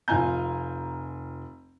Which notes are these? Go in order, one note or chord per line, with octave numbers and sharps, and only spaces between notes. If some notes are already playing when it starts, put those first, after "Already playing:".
F1 F4 G#5 A#5 G6